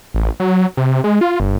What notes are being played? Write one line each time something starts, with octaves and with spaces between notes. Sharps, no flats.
A1
F#3
C3
G#3
F4
G1